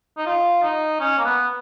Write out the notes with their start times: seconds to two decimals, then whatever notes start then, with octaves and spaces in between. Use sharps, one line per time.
0.17 D#4
0.26 F4
0.63 D#4
1.00 C#4
1.18 A#3
1.25 B3